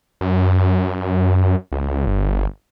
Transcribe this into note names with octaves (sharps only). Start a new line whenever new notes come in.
F#2
C#2
G1